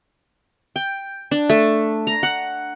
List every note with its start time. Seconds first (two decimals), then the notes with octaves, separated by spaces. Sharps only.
0.76 G5
1.31 D4
1.49 A3
2.07 A#5
2.23 F#5